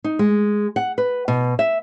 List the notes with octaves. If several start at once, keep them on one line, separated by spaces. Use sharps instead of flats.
D#4
G#3
F#5
B4
B2
E5